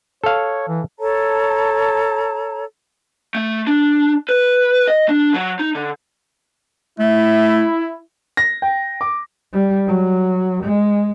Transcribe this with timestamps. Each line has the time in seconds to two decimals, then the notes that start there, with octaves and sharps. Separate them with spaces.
0.24 A4 C#5 F5
0.68 E3
0.99 A4 C#5 A5 A#5
3.35 A3
3.67 D4
4.29 B4
4.88 D#5
5.09 D4
5.34 F#3
5.59 D#4
5.75 D3
6.99 A3 E4
8.37 A#6
8.62 G5
9.01 D6
9.53 G3
9.88 F#3
10.63 G#3